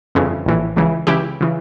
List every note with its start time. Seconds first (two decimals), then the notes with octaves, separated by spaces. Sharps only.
0.15 G1 F2 C#3 E3
0.46 A#1 A2 E3
0.76 C#2 C#3 E3
1.07 C#2 C#3 E3 E4 G4
1.41 C#3 E3